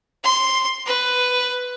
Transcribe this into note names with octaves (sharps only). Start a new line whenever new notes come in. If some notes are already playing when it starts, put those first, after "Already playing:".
C6
B4